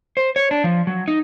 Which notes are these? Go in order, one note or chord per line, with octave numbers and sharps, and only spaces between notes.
C5
C#5
D4
F3
F#3
D#4